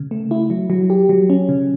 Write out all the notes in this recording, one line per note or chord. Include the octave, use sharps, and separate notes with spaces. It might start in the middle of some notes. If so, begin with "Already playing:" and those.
Already playing: C#3
A3
E4
F#3
F#3
G4
F#3
C#4
C#3